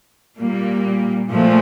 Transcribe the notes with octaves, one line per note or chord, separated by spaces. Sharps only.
A#2 G3 A#3
A#2 F3 A3